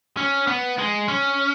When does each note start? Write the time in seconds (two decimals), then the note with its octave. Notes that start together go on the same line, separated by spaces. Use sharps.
0.17 C#4
0.47 B3
0.79 G#3
1.08 C#4